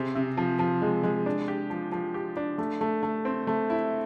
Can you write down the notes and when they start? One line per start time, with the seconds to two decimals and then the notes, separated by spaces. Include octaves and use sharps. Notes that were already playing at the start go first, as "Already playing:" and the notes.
Already playing: C3 C4 G#4
0.15 C3
0.37 F3
0.59 F3
0.82 G#3
1.03 G#3
1.26 D4
1.48 G4
1.70 F3
1.92 F3
2.14 G4
2.37 D4
2.58 A3
2.81 A3
3.03 A3
3.25 C4
3.47 A3
3.70 E4